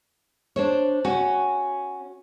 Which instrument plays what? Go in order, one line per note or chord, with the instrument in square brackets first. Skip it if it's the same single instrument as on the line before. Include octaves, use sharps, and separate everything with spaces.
[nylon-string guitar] D4 C5 C#5
[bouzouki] C#4 [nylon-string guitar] F#4